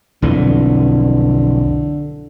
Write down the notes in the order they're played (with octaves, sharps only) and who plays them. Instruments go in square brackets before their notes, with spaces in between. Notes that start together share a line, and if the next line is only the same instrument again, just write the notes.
[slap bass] B1 F2 E3 [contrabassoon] D3